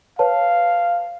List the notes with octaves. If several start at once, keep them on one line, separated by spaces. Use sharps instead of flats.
B4 C#5 F5 A5